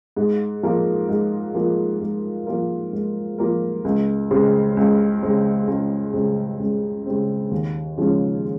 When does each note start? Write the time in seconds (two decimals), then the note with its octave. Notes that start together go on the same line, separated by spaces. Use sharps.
0.17 G#2
0.63 F3 A#3 F4 A#4
1.09 G#2
1.54 F3 A#3 F4 A#4
2.00 G#2
2.47 F3 A#3 F4 A#4
2.93 G#2
3.38 F3 A#3 F4 A#4
3.84 C#2
4.30 C#3 G#3 C4
4.77 C#2
5.22 C#3 G#3 C4
5.67 C#2
6.13 C#3 G#3 C4
6.59 C#2
7.06 C#3 G#3 C4
7.51 D#2
7.98 C#3 F3 G#3 C#4